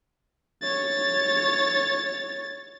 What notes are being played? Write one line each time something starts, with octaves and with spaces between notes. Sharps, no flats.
C#5 A6